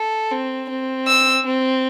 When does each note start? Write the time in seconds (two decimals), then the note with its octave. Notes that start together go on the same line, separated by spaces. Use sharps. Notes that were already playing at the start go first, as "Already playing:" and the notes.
Already playing: A4
0.31 C4
0.69 C4
1.08 E6
1.45 C4